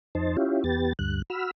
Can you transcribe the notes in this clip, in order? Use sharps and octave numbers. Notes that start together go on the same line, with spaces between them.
F2 D#4 C5 A5
C#4 E4 F4 G4
E2 B3 G4 A6
D2 G2 F#6
F#4 B5 E6 F6